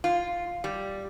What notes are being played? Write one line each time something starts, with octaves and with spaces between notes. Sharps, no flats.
F4
G3